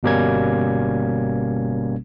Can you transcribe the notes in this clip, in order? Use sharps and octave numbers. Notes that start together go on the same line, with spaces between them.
G1 B2 G3 A#3 C#4 G#6